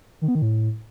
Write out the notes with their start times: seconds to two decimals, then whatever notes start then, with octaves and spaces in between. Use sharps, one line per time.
0.22 D#3
0.28 B3
0.35 D#3
0.42 A2